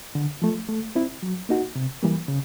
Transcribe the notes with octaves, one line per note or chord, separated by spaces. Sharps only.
D3
F3 A3
A3
C4 E4
F#3
A#3 D#4 F#4
C3
E3 G3 A#3
C#3